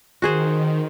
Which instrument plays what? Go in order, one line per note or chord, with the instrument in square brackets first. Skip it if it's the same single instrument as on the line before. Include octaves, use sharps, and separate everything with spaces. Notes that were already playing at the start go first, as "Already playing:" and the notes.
[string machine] D#3 [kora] F#4 G#4 C5